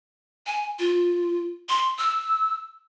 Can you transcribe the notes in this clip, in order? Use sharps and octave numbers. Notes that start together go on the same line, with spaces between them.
G#5
F4
C6
E6